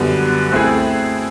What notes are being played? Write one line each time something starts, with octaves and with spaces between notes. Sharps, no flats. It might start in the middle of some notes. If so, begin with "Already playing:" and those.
Already playing: F#2 D3 G3 B3
A3 C4 E4 G#4